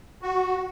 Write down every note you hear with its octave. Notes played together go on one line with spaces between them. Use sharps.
F#4